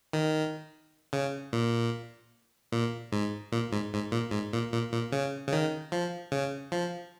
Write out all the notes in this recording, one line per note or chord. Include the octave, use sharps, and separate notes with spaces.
D#3
C#3
A#2
A#2
G#2
A#2
G#2
G#2
A#2
G#2
A#2
A#2
A#2
C#3
C#3
D#3
F3
C#3
F3